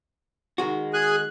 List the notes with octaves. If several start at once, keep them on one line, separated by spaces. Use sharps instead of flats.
D#3 G#3 F#4
G#4 G#5 F#6